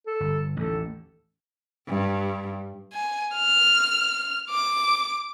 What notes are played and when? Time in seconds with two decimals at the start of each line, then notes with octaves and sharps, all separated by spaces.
0.06 A4
0.20 G1
0.56 A1 D#2 A4
1.88 G2
2.93 G#5
3.35 F6
4.50 D6